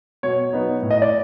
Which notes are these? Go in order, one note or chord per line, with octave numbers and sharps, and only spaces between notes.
B2 C#5
F#3 B3 D#4
A2
D#5
D5